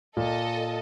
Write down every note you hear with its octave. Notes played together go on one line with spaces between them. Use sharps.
A#2 A4 D#5